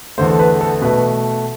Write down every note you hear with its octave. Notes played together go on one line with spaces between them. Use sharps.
E2 D3 A3 C5
A4
B4
A4
B2 A3 B4